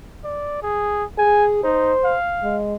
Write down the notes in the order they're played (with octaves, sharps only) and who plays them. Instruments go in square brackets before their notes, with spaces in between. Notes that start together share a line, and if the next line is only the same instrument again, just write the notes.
[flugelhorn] D5
G#4
[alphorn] G#4 [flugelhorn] G#5
[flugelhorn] D#4 [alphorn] C5
[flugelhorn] F5
[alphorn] G#3